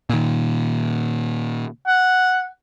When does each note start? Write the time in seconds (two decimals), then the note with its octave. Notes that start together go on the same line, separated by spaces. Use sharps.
0.09 A#2 D#3
1.87 F#5